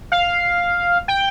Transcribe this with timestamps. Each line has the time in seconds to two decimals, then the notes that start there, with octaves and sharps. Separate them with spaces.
0.12 F5
1.08 G5